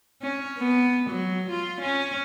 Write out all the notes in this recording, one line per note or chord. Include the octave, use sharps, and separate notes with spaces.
C#4
B3
F#3
F4
C#4